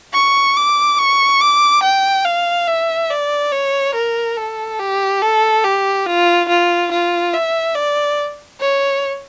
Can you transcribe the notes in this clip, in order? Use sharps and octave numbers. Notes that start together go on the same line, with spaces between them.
C#6
D6
C#6
D6
G5
F5
E5
D5
C#5
A#4
A4
G4
A4
G4
F4
F4
F4
E5
D5
C#5